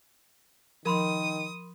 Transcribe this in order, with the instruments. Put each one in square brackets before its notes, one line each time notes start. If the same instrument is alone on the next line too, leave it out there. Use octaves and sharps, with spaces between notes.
[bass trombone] D#3 [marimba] F3 [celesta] A#4 B5 C6 [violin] D#6